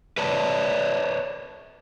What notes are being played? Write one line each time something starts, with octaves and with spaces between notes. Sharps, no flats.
B4 C#5 D5 A5